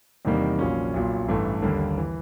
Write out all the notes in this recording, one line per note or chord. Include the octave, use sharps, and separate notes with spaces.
E2 C3 D#3 G3 A#3
A#1 A#2 F#3 A#3 C#4
B1 A#2 F#3
A1 G2 E3 A3
D#2 D3 G3 A#3
E3